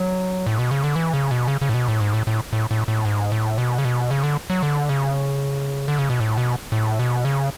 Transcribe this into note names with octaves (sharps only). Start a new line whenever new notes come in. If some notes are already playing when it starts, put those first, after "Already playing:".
Already playing: F#3
A2
B2
C#3
D3
E3
C#3
B2
C#3
C#3
A2
B2
A2
G#2
A2
A2
A2
A2
A2
G#2
A2
B2
C#3
B2
C#3
D3
F#3
D3
C#3
D3
C#3
B2
A2
B2
A2
B2
C#3